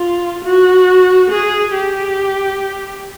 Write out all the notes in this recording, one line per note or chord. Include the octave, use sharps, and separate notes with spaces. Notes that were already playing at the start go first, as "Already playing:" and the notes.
Already playing: F4
F#4
G#4
G4